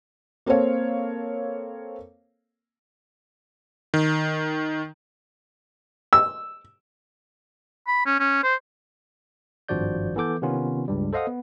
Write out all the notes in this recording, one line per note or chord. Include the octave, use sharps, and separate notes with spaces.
A#3 C4 A4 A#4 C#5 F5
D#3
E6
B5
C#4
C#4
C5
G#1 G2 F3 F#4 D5 G6
E3 B3 A4 D6 G6
C3 D#3 B3 C#4 F4
C#2 G2 G3
A4 C5 D#5 F5 F#5 D#6
B3